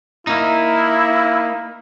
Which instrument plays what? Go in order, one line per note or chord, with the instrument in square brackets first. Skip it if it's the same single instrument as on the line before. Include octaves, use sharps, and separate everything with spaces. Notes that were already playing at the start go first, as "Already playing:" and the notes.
[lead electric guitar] A#3 D#4 [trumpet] E4